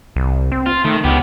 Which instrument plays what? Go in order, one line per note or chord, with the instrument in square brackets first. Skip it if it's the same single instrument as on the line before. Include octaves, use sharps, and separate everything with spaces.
[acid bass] C2
C4
[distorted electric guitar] F4
[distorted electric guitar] D#3 [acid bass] A3
[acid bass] C#2 [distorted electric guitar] B3 G4